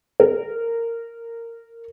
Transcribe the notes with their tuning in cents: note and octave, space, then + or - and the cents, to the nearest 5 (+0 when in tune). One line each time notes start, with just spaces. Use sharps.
A#4 -15